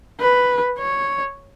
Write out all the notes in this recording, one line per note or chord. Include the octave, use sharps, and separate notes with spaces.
B4
C#5